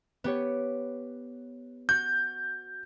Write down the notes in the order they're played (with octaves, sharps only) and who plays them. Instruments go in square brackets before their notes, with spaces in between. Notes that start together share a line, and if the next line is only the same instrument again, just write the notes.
[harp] B3 G4 C#5
[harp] F#4 [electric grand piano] G6